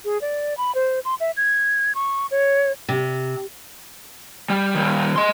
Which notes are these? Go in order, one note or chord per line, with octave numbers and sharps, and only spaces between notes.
G#4
D5
B5
C5
C6
E5
G#6
C#6
C#5
C3
G3
D#3 G3
D#5 C6